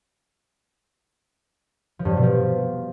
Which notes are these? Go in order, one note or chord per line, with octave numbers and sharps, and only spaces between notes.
F3
G2
F3
B2
F3